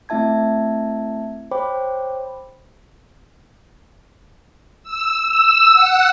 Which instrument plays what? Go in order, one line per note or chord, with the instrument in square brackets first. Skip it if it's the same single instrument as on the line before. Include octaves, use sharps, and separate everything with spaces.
[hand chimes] A3 C4 E4 E5 A5 G#6
C5 C#5 G5 B5 D6
[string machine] E6
E6
F#5